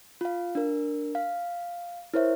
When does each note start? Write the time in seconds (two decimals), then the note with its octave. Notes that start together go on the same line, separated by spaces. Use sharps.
0.21 F4 F5
0.55 D4 A#4
1.15 F5
2.14 E4 A#4 C5 C#5 E5